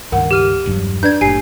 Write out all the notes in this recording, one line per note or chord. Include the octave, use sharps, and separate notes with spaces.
C#2 G2 D#3 A#4 F#5
G4 F6 D#7
E1 G2 F#3
D4 B4 D5 G6 G#6
F#1 A2 G4 G#5 C7